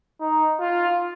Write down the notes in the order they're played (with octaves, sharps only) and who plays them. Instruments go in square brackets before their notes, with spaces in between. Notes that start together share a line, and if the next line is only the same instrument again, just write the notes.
[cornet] D#4
F4